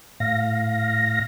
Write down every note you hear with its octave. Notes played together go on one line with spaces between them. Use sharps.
A2 F5 A#6